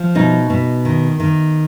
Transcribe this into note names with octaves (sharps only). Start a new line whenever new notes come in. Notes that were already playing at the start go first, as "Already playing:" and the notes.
Already playing: F3
B2 D#4
B2
D#3
D#3